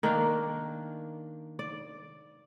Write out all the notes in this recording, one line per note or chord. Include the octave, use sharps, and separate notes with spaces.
D#3 A#3 D4
D5